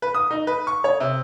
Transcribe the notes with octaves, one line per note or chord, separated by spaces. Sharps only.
B4
D#6
D#4
B4
C#6
C#5
C3